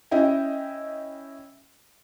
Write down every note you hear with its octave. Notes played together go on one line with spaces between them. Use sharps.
C#4 E4 D#5 G5